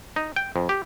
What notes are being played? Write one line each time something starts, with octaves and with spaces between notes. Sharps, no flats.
D#4
G5
F2
G4